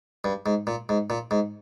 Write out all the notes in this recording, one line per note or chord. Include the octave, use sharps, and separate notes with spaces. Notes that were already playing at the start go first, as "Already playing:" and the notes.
G2
G#2
A#2
G#2
A#2
G#2